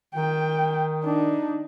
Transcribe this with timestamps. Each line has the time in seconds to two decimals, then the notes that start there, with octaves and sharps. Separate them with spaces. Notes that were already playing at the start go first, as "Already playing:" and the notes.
0.15 D#3 G5
1.04 D4 D#4